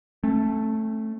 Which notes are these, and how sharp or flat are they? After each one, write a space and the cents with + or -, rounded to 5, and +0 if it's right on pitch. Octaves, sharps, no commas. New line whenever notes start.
A3 +0 C#4 -45